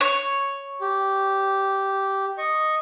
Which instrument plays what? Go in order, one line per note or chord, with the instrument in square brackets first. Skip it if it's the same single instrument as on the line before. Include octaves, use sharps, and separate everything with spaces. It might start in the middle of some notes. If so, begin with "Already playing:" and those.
[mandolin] C#5
[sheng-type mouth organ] G4
D#5 C#6